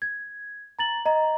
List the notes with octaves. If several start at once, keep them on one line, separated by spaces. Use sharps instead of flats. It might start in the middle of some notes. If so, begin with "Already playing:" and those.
G#6
A#5 A6 F#7
D#5 A#5